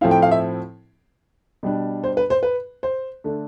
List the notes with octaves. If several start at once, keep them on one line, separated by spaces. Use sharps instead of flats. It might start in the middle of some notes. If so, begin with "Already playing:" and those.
A2 F3 C4 E4 F5
G5
F5
E5
B2 G3 D4
C5
B4
C5
B4
C5
D3 A3 D4